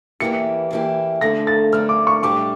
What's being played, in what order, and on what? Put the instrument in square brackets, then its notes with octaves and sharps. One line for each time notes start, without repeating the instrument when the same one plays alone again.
[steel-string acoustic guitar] E2 E3 A#3 E4 G4 [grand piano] C#7
[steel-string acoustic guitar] E2 E3 A#3 E4 G4
[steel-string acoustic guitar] D3 A3 D4 [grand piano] A#6
[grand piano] A6
[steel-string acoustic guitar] D3 A3 D4 [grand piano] F6
[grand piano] D6
C#6
[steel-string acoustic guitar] A2 G3 D4 G4 [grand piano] D6